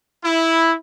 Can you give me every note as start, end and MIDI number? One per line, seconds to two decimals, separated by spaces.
0.25 0.75 64